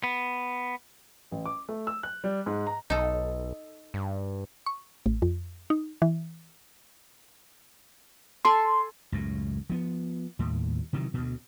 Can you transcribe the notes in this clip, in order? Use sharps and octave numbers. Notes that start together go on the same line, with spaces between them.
B3
A1
D6
A3
E6
F#6
G3
G#2
A#5
B1 D#4 A4
G2
C#6
A1
F2
D#4
E3
A4 G#5 C6
C#2 F#2 A2
F3 B3
D#2 A2 G3
C3 D#3 E3 F#3
D2 B2